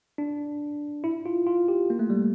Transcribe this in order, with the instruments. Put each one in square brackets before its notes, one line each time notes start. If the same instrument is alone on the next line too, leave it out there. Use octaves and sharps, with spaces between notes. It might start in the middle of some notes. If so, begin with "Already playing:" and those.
[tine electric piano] D4
E4
F4
F4
G4
A#3
A3
G3